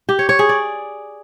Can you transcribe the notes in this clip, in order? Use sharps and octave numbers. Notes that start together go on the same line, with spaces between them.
G4
C#5
C#5
G#4
D5